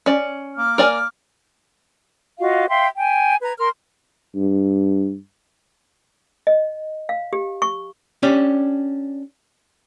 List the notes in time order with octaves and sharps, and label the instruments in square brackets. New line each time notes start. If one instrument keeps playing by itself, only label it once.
[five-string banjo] C#4 D5
[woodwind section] A#3 D6 F6
[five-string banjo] A#4 D5 G#5
[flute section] F4 F#4 D#5 F5
E5 F5 G5 C6
G5 G#5
B4 A#5 G#6
A#4 C6 F6
[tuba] G2
[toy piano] D#5
F5
G4
C#6
[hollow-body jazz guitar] C#4 D4 G4